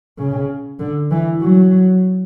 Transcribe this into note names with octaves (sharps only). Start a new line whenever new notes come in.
C#3
D3
E3
F#3